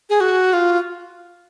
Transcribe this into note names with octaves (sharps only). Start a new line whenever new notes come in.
G#4
F#4
F4